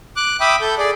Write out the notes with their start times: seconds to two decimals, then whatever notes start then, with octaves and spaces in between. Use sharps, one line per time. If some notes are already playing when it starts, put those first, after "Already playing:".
0.16 D6 F#6
0.40 E5 G5 B5 D6 D#6
0.61 A4 G6
0.78 G#4 D5